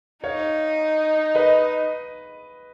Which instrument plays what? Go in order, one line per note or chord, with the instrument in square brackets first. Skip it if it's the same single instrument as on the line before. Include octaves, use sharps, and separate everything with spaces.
[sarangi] D#4 [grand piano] C#5 F5
[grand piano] B4 D#5